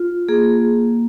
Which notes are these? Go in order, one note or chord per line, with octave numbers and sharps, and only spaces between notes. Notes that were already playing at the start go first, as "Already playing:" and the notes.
Already playing: F4
A#3 G#4